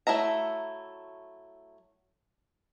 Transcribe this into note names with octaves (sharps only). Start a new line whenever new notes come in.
F#3 A3 E4 E5 A#5